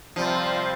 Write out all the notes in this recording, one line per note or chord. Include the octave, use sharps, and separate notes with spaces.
C3 F3 G3 C4 F4 C5